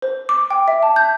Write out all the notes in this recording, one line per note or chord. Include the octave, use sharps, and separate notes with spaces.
C5
D6
G5
E5
A5
G6